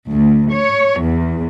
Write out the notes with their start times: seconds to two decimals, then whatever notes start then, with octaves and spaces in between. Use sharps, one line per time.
0.10 D2
0.54 C#5
1.02 E2